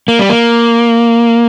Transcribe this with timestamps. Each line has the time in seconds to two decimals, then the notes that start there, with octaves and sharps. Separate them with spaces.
0.08 A#3
0.19 G3
0.30 A#3